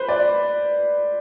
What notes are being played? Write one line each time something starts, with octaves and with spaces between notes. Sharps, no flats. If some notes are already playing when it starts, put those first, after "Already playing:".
Already playing: B4 C5
D5